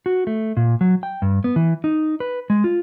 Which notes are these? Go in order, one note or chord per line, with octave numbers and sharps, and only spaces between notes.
F#4
A3
A#2
F#3
G5
G2
B3
E3
D#4
B4
G#3
F4